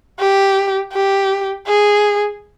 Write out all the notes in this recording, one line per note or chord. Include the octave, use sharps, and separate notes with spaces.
G4
G4
G#4